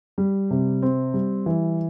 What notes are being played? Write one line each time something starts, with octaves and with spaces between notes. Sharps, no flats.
G3
C3
C4
G3
E3